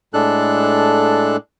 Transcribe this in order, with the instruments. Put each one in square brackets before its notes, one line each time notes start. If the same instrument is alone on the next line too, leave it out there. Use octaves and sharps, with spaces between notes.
[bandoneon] A2 G#3 D4 A4 F#6